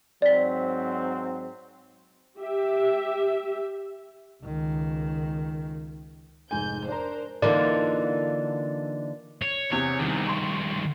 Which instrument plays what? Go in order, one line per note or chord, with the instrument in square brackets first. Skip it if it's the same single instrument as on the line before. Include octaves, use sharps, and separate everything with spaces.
[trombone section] G#2 F#3 C4 [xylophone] D5 B6
[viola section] G4 E5
[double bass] C#2 D#3
[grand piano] F1 G#2 G#5 [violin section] G6
[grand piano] D4 A#5 [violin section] A#4 C5
[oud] D3 E3 A#3 [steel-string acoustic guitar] D#4 F4 [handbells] D5
[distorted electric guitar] C#5
[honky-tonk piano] E2 C3 [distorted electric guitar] C#5
[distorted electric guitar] G2 D#3
[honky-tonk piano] C6 C#6